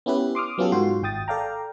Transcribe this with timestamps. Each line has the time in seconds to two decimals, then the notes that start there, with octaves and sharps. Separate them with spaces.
0.06 B3 C#4 E4 G4 B4
0.35 C6 D6 D#6 F6
0.58 F#3 B3 C#4 F4 G4 A4
0.72 G#2 F4 F#4 C6
1.03 G#1 G5 D#6 A6
1.28 A4 D5 F5 G5 A#5